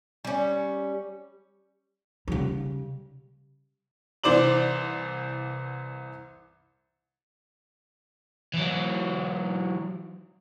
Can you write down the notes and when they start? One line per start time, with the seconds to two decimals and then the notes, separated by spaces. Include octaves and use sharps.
0.25 G3 C#4
2.28 C#3 G3
4.24 C2 E3 C5 D5 D6 F#7
8.54 E3 F#3